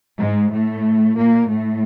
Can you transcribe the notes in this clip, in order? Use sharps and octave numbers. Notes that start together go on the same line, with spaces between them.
G#2 G#3
A2 A3
A#2 A#3
A2 A3